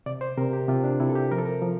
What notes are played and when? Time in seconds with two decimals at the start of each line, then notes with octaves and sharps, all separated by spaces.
0.06 C3 D5
0.21 C5
0.38 C3 A#4
0.53 G4
0.68 C3 F4
0.84 D4
1.00 C3 E4
1.09 A4
1.15 G4
1.31 F3 A#4
1.38 A4
1.46 A#4
1.62 F3